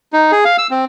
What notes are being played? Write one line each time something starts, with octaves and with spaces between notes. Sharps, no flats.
D#4
G#4
F5
E6
C4